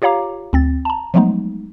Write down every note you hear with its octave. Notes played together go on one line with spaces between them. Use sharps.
F4 G4 C#5 F5 A#5 D6
D2 C4 A6
A5 A#5
F3 F#3 G#3 A3 B3 D#4